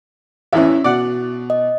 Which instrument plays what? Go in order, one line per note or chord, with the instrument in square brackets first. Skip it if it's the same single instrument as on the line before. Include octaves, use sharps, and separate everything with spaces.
[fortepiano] E2 A2 E3 [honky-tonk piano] C#4 E5
[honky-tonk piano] B2 [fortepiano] D5 F#5
[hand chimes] D#5